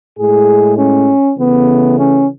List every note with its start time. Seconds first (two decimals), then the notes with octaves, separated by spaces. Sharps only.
0.17 A2 G#3 G#4
0.77 C#4
1.37 C#3 E3 A3 B3
1.98 C#4